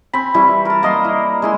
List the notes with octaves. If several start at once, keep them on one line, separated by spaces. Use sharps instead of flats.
C4 G#5 B5
E3 G3 E4 C#6
A#4 A5
A#3 D#5 A#5 C6
E4
G#3 E4 C6